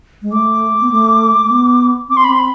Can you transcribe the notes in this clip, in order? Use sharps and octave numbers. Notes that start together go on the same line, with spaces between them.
G#3
A3 D6
B3
A3
A3
B3
C4 D6
C6
B5
C4 C6
B5